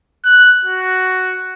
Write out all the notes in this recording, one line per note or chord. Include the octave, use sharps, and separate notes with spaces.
F#6
F#4